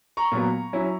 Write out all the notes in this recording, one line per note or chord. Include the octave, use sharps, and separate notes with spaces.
A#5 C#6
A#2 F#3 B3
F#3 C#4 E4